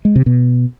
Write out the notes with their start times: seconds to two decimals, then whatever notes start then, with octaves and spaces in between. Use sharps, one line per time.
0.05 G#3
0.16 C3
0.26 B2